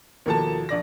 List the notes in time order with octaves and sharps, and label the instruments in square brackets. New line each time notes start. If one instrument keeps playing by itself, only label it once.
[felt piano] D#2 B2 F3 [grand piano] A#3 A4 A5
[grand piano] A#1 D5 A#6